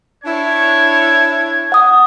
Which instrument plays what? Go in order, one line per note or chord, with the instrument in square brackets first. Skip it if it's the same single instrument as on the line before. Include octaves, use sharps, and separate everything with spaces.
[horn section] D4 E4 C#5 [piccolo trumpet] G#6
[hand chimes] F#5 D#6